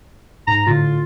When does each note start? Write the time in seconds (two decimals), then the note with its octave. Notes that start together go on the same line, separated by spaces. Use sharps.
0.47 G#2 A#5
0.67 A2 D3 F4